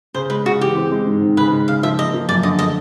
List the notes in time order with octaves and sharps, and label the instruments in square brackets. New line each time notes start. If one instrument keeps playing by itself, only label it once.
[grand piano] C#3 [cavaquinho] C5
[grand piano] G#3 [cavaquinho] B4
[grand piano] C#3 [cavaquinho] F#4
[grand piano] E3 [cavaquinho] G4
[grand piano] C4
G#3
G#2
D#3
[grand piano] C#3 [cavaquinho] B4
[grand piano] G#3
[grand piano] C#3 [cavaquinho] F5
[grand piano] F3 [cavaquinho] E5
[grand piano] A#3 [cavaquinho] D#5
[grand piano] F3
[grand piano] F#2 [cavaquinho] D5
[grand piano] D3 [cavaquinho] D#5
[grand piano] A3 [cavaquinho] D#5